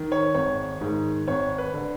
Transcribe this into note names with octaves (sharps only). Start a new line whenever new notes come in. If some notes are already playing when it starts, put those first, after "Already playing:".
Already playing: D#3
C#5
G#1 C#5
G#2 D#3
G#1 C#5
B4
D3